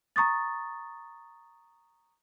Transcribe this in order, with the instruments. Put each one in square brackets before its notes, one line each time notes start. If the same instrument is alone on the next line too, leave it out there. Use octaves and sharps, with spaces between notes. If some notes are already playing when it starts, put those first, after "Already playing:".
[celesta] A#5 C#6 D#6 A6